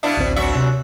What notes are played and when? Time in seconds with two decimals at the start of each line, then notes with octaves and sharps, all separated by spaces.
0.03 B2 D4 E4 E5 F5
0.17 A1 D2 C4
0.36 F#2 F#4 E5
0.55 C3